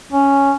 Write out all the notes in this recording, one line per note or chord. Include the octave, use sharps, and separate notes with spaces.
C#4